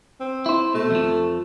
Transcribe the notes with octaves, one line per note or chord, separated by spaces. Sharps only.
C4
E4 C5
B2 A3
F2 F3